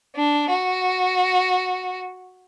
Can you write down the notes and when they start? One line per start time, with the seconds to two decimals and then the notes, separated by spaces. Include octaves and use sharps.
0.16 D4
0.50 F#4